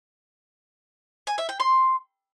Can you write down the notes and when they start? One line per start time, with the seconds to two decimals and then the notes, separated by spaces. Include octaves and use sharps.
1.27 G#5
1.38 E5
1.49 G5
1.60 C6